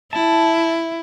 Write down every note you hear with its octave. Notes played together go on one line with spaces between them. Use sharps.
E4 A5